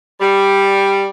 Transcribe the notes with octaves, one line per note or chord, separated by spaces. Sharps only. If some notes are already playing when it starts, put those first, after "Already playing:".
G3